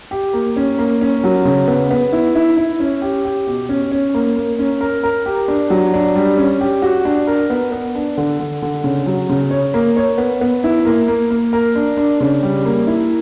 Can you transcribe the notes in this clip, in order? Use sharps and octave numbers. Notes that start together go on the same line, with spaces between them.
G4
A#3
C#4
A#3
C#4
F#3
C#3
B3
B3
E4
E4
E4
C#4
G4
G4
B2
C#4
C#4
A#3
A#3
C#4
A#4
A#4
G4
D4
F#3
D4
G3
C#4
G4
F#4
D4
A#4
B3
B3
D4
D3
D3
D3
C#3
F#3
C#3
C#5
A#3
C#5
B3
B3
E4
A#3
A#3
A#3
A#4
D4
D4
C#3
G3
A#3
E4